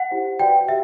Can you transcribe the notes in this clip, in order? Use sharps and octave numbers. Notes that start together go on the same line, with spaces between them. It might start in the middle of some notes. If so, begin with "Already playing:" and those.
Already playing: F#5
E4 G4 C5
F#4 B4 D5 G5
G4 E5